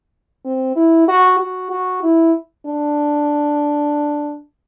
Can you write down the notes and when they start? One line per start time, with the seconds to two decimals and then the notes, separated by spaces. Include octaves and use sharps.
0.45 C4
0.76 E4
1.08 F#4
1.39 F#4
1.71 F#4
2.03 E4
2.66 D4